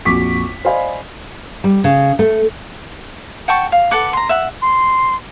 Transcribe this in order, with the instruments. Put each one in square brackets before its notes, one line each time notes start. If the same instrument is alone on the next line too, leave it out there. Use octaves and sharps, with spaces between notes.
[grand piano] A#1 F2 F#4 C#6 D6 B6
C5 D5 D#5 F5 G#5 B5
[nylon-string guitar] G3
C#3
A3
[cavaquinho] F#5 G5 A5 C#6
F5
A4 B4 F#5 D6
A#5 C6
E5 F#5
[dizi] C6